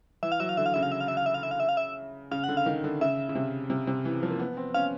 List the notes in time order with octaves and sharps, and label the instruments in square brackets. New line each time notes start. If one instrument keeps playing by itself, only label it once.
[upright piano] E3 [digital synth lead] E5
[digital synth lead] F5
[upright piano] F#3 [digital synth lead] E5
[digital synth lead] F5
[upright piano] D3 [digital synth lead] E5
[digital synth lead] F5
[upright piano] C#3 [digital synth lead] E5
[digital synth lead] F5
E5
F5
E5
F5
E5
F5
E5
F5
E5
F5
E5
[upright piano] C#3 [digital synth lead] F5
[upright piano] D3 [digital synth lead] F#5
[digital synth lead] F5
[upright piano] D#3
D3
[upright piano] C#3 [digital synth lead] E5
[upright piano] C#3
C3
C3
C3
E3
F3
A#3
B3
C4
[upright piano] C#4 [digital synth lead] F5